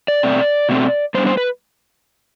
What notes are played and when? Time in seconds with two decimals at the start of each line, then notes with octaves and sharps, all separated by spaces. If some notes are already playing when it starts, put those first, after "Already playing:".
0.08 D5
0.23 B2 A3 C4
0.69 B2 A3 C4
1.14 A2 G3 B3 D4 C5
1.27 C5
1.37 B4